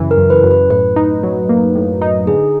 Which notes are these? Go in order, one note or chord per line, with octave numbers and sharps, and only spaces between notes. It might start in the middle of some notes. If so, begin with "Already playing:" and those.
Already playing: F#2 C#3 E3
A#4
F#2
B4
F#2
B4
A2 B4
D#4
F#3
A#3
A2
D#4
D3 G#4